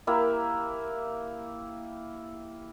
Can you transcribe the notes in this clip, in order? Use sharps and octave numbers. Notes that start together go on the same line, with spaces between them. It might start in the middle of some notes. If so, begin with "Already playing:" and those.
A#3 E4 G4